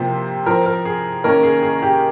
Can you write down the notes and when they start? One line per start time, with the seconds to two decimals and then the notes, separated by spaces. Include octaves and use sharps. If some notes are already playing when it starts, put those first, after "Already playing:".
Already playing: C3 F3 A#3 C5
0.46 F3 C4 A#4
0.66 A#4
0.85 G#4
1.24 D#3 A#3 C#4 A#4
1.43 G#4
1.63 G#4
1.82 G4